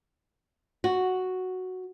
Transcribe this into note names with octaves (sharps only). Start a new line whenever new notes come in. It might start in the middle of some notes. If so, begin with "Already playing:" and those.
F#4